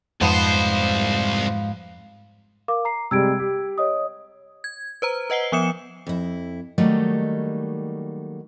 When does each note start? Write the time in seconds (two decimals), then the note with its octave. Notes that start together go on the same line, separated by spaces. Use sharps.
0.21 C2 F2 G#2 F3 B3 C5
2.68 A#4 F5 D6
2.85 A#5 C7
3.11 C3 G3 G#3 E6 G#6 D7
3.39 G4
3.78 C#5 D#5 D#6
4.64 G#6
5.02 B4 C5 A#5
5.30 B4 D#5 F#5 C7 G7
5.52 F3 B3 D#6 C#7 E7
6.07 F2 E4
6.78 D#3 F#3 G3 A3 A#3 D#4